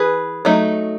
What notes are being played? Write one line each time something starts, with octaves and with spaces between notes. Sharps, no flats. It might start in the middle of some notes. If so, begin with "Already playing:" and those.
Already playing: E3 G#4 B4
F#3 A3 D#4